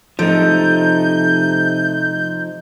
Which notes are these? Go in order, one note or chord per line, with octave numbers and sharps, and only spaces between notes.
C3 F3 A3 D#4 G6